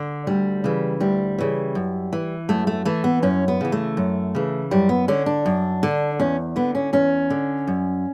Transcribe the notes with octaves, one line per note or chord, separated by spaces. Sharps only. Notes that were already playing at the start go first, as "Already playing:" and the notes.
Already playing: D3
D2 G3
C#3 E3
D2 G3
C#3 E3
F#2
E3
F#2 A3
A3
E3 A3
B3
F#2 C#4
B3
C#3 E3
A3
F#2
C#3 E3
F#2 G3
B3
D3 C#4
D4
F#2
D3
E2 C#4
D3 B3
C#4
E2 C#4
D3
F#2